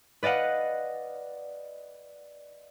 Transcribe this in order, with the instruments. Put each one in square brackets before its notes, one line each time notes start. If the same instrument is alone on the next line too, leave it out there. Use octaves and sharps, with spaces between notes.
[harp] B4 D5 D#5 F5 F#5